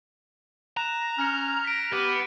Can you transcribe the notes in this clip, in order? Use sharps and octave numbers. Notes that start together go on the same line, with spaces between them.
A#5 F#6 E7
C#4 F6 A#6 C#7
B6 D7
B3 G4